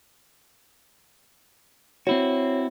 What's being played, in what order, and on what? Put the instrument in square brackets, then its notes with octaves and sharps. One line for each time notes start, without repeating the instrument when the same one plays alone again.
[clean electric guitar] C4 E4 F#4 [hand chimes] C#5